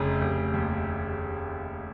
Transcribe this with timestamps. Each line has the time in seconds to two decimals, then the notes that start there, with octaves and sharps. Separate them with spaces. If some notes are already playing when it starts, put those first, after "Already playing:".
Already playing: F1 C#3
0.21 F1
0.54 D#2